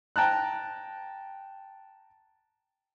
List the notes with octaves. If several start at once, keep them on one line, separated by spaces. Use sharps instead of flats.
G5 A5 A#5 F#6